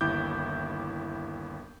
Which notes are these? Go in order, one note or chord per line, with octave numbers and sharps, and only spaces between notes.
G1 D#2 E4 D6 G6